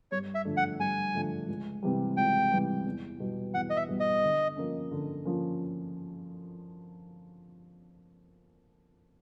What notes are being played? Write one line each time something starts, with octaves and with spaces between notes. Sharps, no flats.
G2 C#5
E5
D3 F3 A3 D4
F#5
G2 G#5
D3 F3 A3 D4
C#2
C3 E3 G3
C#2 G5
C3 E3 G3
E2
B2 G3 B3
E2 F#5
D#5
E5
B2 G3 B3
D#5
D3
F3 A#3 C#4
D3
F3 A#3 C#4